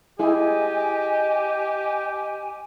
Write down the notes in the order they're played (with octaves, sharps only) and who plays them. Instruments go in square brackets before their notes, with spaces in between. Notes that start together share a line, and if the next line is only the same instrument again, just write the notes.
[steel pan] E4 G#4 [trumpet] G4 [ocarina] D#5 [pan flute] G#5